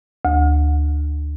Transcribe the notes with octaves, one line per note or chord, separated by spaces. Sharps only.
D2